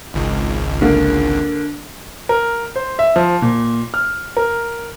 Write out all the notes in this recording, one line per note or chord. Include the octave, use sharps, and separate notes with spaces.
G#1 C#2
D3 A#3
A#4
C5
E5
F3
A#2
F6
A#4